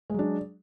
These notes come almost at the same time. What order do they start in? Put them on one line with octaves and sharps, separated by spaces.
G#3 F#3 D4